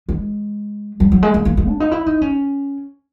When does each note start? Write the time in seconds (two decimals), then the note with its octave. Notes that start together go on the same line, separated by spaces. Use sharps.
0.09 G#3
1.00 G3
1.12 F#3
1.23 G#3
1.34 A#3
1.45 A#3
1.57 G#3
1.68 D4
1.80 D#4
1.91 E4
2.06 D#4
2.22 C#4